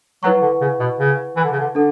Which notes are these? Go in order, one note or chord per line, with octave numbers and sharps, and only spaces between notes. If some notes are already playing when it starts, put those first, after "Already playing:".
F#3 E4 B4 F#5 C#6
D3
C#3
B2
C#3
E3
D3
C#3
D3
D3 D4 A4